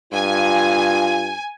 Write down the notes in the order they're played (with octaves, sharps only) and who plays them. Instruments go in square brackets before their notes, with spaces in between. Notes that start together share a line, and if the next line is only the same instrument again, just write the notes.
[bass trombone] G2 [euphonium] F4 [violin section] G#5